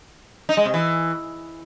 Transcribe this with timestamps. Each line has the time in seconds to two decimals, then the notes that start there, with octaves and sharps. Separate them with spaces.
0.49 D#4
0.57 G#3
0.65 C3
0.74 E3